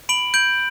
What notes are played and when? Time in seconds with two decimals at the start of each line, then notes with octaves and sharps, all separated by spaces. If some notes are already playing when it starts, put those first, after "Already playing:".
0.09 B5 D7 F#7
0.34 G6 D7 F#7